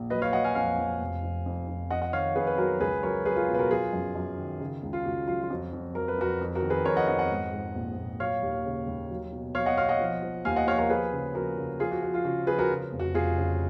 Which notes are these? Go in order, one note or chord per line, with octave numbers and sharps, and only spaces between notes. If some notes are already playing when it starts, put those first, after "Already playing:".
Already playing: A#1
F#3 B4 D#5
C#5 F5
F#3 D#5 F#5
F5 G#5
F2 F5 G#5
F2
F1
F2
F2
F2
F2 D#5 F#5
D#5 F#5
D#3 C#5 F5
F2 G#4 B4
B4
F#3 F#4 A#4
C#2 G#4 B4
F#3 A#4 C#5
F#3 G#4 B4
F4 G#4
B2
B4
F#4 A#4
F#3 F4 G#4
F#2
F#2
D#3
C#3
C#2
F4
C#2 F#4
F#3 F4
F4
F2 F#4
F2
F#3 A#4
B4
F2 F#4 A#4
F2
F#4 A#4
D#3
G#4 B4
F2 A#4 C#5
D#5 F#5
F2 D#5 F#5
D#5 F#5
G#2
G#2
A#1
A#1
F#3 C#5 F5
D#2
C#3
D#2
F#3
B2
F#3 C#5 F5
D#5 F#5
B1 C#5 F5
D#5 F#5
F3
F3
D#2 F5 G#5
D#5 F#5
F3 C#5 F5
A#4 C#5
F3 G#4 B4
C#3
F3 F#4 A#4
C#3
F3 F4 G#4
F#4
F3 F#4
F4
C#3 F#4
F3 G#4 B4
F#4 A#4
C#3
F1
F#4
F1 F4 G#4
C#3